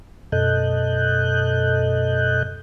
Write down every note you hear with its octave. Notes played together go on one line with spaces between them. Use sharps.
F#2 B2 A4 D#5 F#6 G6